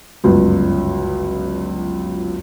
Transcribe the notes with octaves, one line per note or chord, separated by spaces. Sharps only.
G1 C#2 F#2